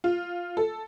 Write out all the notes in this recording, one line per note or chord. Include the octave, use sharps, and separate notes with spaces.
F4
A4